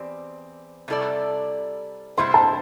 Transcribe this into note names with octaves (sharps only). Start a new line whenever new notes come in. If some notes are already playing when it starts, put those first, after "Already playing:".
Already playing: E2 C4 G4 D5
C3 G3 E4 A4 D5
C3 G3 E4 C5 C6
A5